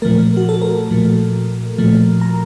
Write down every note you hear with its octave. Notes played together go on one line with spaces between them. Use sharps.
A#2 F3 A3 A#4
F#4
A4
A#4
A#2 F3 A3
A#2 F3 A3
A#5